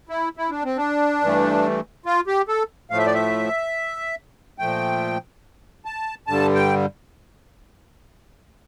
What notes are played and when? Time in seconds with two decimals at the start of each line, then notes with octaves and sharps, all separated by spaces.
0.09 E4
0.37 E4
0.50 D4
0.64 C4
0.77 D4
1.21 G2 E3 A3
2.06 F4
2.27 G4
2.48 A4
2.90 A2 F3 A3 F5
2.98 E5
3.06 D5
3.14 E5
4.58 A#2 F3 A3 G5
5.85 A5
6.27 G2 D3 G3 A5
6.55 G5